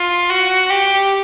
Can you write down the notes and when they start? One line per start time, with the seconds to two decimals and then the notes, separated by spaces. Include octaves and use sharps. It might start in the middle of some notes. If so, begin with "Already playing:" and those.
Already playing: F4
0.30 F#4
0.70 G4